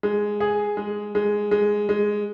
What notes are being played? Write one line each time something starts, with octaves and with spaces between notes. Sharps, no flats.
G#3
G#4
G#3
G#3
G#3
G#3